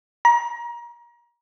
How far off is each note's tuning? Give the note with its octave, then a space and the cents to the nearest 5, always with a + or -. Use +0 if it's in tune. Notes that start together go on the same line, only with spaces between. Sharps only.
A#5 +30